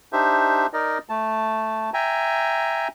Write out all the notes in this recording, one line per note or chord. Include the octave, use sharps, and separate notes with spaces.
D4 D#4 G4 C5 E5
D#4 A#4 D5 D#5
A3 A5
E5 G5 G#5 A#5